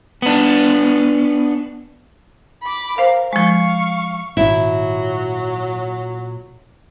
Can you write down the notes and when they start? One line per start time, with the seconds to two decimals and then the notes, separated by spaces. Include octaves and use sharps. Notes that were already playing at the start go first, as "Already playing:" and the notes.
0.22 B3 D4
2.63 B5 D6
2.98 A#4 C5 F5
3.33 F3 G#3 F5 C#6
4.37 G#1 A#2 F#3 E4